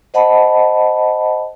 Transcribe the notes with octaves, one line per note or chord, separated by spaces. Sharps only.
C5 D#5 F#5 A5 B5